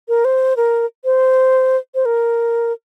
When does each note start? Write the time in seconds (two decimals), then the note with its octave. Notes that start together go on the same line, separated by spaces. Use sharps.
0.08 A#4
0.25 C5
0.57 A#4
1.05 C5
1.95 C5
2.05 A#4